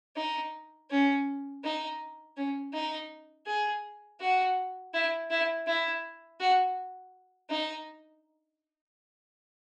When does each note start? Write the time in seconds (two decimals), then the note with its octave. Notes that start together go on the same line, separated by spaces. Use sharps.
0.16 D#4
0.90 C#4
1.64 D#4
2.37 C#4
2.74 D#4
3.46 G#4
4.20 F#4
4.94 E4
5.30 E4
5.67 E4
6.40 F#4
7.50 D#4